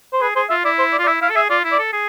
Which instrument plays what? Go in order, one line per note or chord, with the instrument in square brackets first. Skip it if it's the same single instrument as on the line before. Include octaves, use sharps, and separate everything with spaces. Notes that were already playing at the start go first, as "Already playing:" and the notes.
[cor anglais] C5
[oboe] G#4 [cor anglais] B4
[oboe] G#4 [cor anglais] C5
[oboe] F4 [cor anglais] E5
[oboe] E4 [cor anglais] D5
[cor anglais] C5
D5
[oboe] F4
[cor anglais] D5
[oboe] E4 [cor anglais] E5
[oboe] E4 [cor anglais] F5
[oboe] A4
[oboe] G#4 [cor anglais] E5
[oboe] F4 [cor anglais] D5
[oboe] E4
[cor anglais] D5
[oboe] A4
G#4